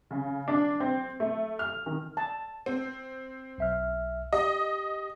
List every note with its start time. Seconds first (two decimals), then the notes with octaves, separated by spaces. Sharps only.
0.11 C#3
0.48 D4
0.80 C4
1.20 A3
1.59 F6
1.86 D#3
2.17 A5
2.66 C4
3.58 B1 E5 F6
4.33 G4 D#5